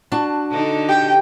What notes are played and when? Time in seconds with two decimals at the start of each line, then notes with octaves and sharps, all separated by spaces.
0.12 D4 F#4 A5
0.51 D3 D#4 A4
0.89 G4 G5